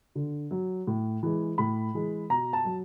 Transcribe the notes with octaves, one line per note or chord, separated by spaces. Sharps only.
D3
F#3
A2
E3 G#3
A2 B5
E3 G#3
B2 A#5
A5
F#3